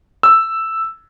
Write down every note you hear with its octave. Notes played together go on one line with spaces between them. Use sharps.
E6